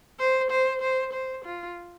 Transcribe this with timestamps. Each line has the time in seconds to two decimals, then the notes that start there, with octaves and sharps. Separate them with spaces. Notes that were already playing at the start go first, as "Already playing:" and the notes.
0.19 C5
0.51 C5
0.81 C5
1.13 C5
1.44 F4